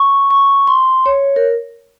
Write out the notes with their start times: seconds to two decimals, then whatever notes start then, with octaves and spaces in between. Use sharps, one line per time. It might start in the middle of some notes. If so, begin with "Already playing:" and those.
Already playing: C#6
0.31 C#6
0.67 C6
1.06 C#5
1.36 A#4